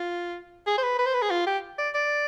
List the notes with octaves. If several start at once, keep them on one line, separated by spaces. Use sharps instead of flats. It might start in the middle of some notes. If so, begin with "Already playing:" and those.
Already playing: F4
G#4
C5
B4
B4
C5
B4
G#4
F4
G4
D5
D5